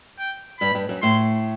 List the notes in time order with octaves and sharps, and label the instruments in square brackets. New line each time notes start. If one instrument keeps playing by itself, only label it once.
[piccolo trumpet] G5
[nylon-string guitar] G2 [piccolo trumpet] B5
[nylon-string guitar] G2
F#2
[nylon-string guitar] A2 [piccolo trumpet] C6